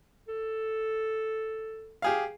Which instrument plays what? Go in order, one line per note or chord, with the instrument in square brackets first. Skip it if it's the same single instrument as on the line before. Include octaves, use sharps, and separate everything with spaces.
[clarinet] A4
[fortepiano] G4 G#4 F5